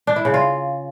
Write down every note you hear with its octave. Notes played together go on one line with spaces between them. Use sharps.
D4
E4
C#3
F4